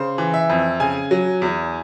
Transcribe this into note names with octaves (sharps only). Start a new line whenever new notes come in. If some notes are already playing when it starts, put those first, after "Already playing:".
Already playing: C#3 C5
E3
E5
F2
C#3 G#5
F#3
E2